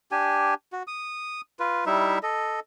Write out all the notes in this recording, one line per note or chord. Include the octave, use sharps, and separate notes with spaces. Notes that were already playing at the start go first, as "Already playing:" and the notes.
D4 G4 G#5
F#4
D#6
F4 B4
G3 D#4 E4 E5
A4 D#5